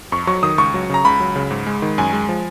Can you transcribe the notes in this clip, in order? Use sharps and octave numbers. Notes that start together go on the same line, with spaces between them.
F2 C#6
F#3 C#6
D#3 D#6
C#2 C#6
F#3
C#3 A#5
C#2 B5
F#3
C#3
G#2
G#3
D#3
F#2 G#5
G#3
F3